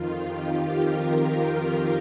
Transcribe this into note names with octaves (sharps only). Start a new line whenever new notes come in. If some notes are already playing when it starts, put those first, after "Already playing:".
Already playing: F2 D#3 F4
G4
A#4
A#4